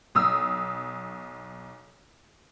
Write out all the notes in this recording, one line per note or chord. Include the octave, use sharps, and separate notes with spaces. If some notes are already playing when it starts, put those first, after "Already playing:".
B1 D#6 E6